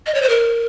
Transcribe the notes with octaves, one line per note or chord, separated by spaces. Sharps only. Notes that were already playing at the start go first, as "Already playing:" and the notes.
D#5
C#5
C5
A#4